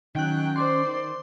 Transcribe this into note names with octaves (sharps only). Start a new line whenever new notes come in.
D#3 F#3 C#4 G5 F#6
C5 D5 C6
D#3